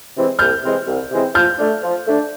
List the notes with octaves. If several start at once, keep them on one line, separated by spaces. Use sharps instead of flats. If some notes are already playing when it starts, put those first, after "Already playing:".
C3 E3 G#3 C4
C2 F6 G6
C3 E3 G#3 C4
C2
C3 E3 G#3 C4
F3 F6 G6
A3 D4
F3
A3 D4